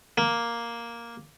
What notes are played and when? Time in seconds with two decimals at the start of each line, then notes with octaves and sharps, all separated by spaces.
0.18 A#3